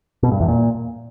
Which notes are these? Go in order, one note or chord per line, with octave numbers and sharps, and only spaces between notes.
B2
G2
E2
A#2